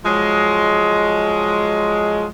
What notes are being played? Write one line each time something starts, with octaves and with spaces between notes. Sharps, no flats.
F3 F#3 G#3